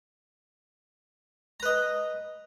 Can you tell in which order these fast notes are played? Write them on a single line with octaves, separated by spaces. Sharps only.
A#5 B4 D#5